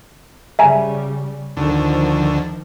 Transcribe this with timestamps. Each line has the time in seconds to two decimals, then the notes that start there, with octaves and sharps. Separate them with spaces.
0.59 C#3 G3 E5 G#5 A#5
1.57 D2 D#3 F3